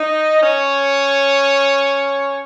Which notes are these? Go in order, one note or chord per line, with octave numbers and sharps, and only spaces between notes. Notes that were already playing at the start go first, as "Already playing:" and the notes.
Already playing: D#4 D#5
C#4 C#5